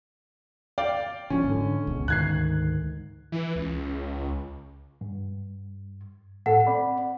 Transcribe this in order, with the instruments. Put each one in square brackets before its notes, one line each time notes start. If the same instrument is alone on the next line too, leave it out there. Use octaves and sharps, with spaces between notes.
[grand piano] D5 F5 G5
[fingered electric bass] C#3 F3 [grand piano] C#4
[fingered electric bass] G#2 D3
C#2 B2
[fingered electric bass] D2 G#2 D#3 [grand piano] F#6 G#6 C7
[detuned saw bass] E3
C#2
[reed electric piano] G2
[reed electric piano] A2 A4 [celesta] F#5
[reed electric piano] C4 D5 B5